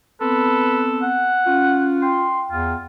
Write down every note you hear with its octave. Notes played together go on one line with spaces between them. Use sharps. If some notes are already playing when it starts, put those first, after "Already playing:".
B3 C4 A4 B4
F#5
C#4 F4
G5 C6
E2 F4